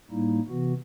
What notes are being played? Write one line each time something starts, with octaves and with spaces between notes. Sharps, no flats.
A2 G3 A#3 D#4 E4
C3 E3 B3 F#4